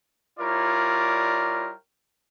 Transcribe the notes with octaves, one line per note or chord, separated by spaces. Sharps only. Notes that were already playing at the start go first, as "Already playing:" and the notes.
G3 E4 F4 A#4 C#5 D5